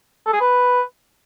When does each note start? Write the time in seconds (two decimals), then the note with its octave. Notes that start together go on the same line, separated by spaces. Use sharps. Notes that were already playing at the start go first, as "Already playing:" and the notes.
0.26 A4
0.33 G#4
0.40 B4